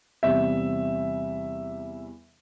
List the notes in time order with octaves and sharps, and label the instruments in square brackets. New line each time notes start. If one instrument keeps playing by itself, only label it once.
[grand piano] E2 C3 G3 E5